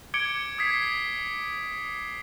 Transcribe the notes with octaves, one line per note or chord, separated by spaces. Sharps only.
D6 G#6 C#7 D7 G7
D#6 G#6 B6 C7